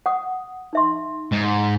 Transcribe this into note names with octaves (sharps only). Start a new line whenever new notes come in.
F#5 D#6
D#4 E5 C6
G#2